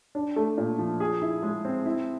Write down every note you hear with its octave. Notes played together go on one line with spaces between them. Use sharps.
D4
A3
A#2
F3
G#4
E4
G#3
C4
E4